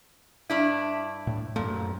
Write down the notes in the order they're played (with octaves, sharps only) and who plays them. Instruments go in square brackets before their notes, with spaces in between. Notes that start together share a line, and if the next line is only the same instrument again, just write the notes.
[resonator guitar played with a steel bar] G2 D4 E4
[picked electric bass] A2
[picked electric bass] F#2 A3 [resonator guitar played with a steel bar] A#2